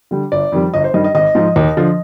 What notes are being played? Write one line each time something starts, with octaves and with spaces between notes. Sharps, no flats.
D3 G3
G1 D5
F2 D#3 G3
G1 D#5
C5
G2 D#3 G3 D#5
D#5
G#1 D#5
G#2 F3
D#2
D3 F3